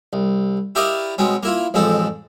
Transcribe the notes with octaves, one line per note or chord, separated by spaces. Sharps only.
C2
E4 G4 A#4 D5 D#5 F5
B2 G#3 C4 C#4
A#3 E4 F4
A1 F2 G#3 C4 A4